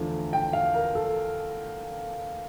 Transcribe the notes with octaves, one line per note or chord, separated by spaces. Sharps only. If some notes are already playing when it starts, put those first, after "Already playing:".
Already playing: E2 D3 F3 A3
G5
F5
A#4
A4